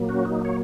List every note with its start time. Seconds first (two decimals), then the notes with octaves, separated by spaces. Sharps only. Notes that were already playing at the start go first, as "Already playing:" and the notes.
Already playing: A#2 F#3 A#3
0.09 C#4 F#4
0.25 D#4
0.45 C#5